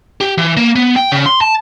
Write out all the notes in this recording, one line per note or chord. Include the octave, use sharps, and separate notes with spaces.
G4
E3
A#3
B3
G5
C#3
C6
A5